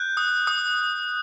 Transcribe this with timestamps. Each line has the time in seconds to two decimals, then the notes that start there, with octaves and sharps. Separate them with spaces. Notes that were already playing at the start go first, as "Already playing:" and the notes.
Already playing: F#6 G6
0.17 D#6
0.47 D#6